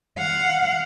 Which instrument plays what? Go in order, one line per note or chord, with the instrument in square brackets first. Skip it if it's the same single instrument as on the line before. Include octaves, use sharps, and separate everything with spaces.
[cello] F5 F#5